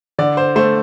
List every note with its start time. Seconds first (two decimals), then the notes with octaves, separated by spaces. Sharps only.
0.18 D3 D5
0.37 C5
0.56 A3 C5